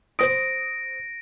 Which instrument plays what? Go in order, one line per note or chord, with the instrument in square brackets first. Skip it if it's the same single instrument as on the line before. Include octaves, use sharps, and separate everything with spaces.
[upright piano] C5 D#6 [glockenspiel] A#6 D7